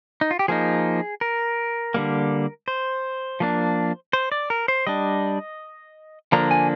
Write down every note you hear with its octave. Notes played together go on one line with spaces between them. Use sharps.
D#4
F4
G4
F3 A#3 D#4 G#4
A#4
D3 G3 A#3
C5
F3 A#3 D4
C5
D5
A#4
C5
G3 D4 D#5
D3 F3 A#3 D4 A#5
G#5